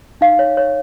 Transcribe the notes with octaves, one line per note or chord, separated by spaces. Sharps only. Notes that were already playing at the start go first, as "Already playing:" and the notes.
D#4 F5
C#5
C#5